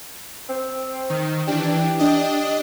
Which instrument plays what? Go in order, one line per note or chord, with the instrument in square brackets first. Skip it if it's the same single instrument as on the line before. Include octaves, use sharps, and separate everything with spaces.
[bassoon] C4
[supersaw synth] D#3
[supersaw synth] E3 D4 [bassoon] G4
[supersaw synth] D4 D#5